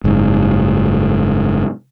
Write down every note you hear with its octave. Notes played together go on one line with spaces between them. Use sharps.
F#1 G#2